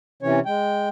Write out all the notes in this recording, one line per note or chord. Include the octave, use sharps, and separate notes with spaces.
C3 E3 C#4 C#5
G#3 G5